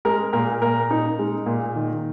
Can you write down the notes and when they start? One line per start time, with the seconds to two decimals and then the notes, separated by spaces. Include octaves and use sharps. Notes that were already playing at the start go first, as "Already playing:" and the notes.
0.05 G#3 A#4
0.33 A#2 A#4
0.62 A#2 A#4
0.91 D#4
1.19 G#3
1.46 A#2
1.76 D#3